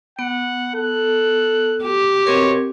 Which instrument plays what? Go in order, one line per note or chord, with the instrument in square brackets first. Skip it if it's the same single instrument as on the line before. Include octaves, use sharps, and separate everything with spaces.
[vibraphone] B3 [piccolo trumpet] F#5
[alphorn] A4 [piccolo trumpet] F#6
[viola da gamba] G4
[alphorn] B2 [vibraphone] C4 A#4 [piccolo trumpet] C#5